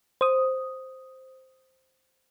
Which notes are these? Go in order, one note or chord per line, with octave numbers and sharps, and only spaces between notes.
C5 D#6